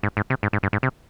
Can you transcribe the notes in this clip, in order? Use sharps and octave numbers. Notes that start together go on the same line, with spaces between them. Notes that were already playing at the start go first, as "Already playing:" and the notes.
G#2
G#2
C3
G#2
G#2
G2
G#2
C3